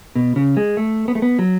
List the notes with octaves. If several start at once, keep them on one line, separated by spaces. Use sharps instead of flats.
B2
C#3
G#3
A3
B3
A3
B3
F#3